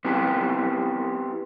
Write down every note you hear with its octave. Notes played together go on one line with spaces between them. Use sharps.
B3 C4 E4 F#4 G4